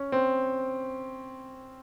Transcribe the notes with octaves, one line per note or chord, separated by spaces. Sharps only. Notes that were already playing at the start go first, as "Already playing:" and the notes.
Already playing: C#4
C4